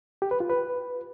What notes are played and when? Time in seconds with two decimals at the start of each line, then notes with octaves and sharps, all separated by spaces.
0.22 G4
0.31 B4
0.40 F4
0.50 B4